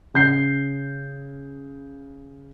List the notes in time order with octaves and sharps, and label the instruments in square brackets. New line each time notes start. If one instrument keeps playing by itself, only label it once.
[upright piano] C#3 G6 C7